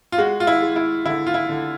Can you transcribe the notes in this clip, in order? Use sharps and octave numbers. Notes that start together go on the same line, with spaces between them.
F4
G#3 F#4
F4
E4
G#3
E4
D3 E4
F4
E4
D3